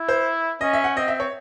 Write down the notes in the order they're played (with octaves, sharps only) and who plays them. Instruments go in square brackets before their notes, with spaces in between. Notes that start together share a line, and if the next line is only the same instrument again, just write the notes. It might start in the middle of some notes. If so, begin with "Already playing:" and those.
Already playing: [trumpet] E4
[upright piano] C5
[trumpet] C#4 [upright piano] D#5
[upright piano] E5
F#5
[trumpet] C4 [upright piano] D#5
[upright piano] E5
C#5